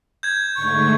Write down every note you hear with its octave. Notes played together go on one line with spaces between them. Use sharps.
G6 G#6
G#2 D3 A3 C#6